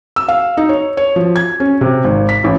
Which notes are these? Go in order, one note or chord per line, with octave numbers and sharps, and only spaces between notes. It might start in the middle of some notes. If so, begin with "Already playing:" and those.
E6
F5
D#4
C#5
C#5
F3
G#6
C#4
C3
G#1
B6
A1